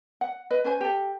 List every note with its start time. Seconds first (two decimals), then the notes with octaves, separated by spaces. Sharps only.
0.21 F#5
0.50 B4 D#5
0.64 C#4 B4 C5 G#5
0.81 G4 A4